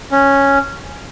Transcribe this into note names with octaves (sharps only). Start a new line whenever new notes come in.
C#4